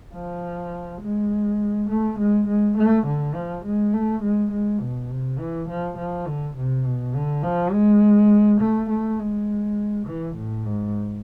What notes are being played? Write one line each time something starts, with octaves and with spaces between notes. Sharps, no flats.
F3
G#3
A3
G#3
G#3
A3
D3
F3
G#3
A3
G#3
G#3
B2
C3
E3
F3
F3
D3
C3
B2
D3
F3
G#3
A3
A3
G#3
E3
A2
G#2